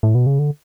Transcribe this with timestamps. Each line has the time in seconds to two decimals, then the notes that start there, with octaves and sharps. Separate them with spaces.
0.03 A2
0.15 B2
0.26 C#3
0.39 D3